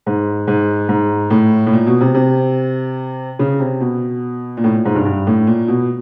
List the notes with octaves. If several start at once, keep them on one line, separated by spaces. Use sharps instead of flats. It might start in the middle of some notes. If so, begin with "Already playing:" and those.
G#2
G#2
G#2
A2
A2
A#2
B2
C3
C3
C#3
C3
B2
A#2
A2
A#2
G#2
G2
G2
A2
A#2
B2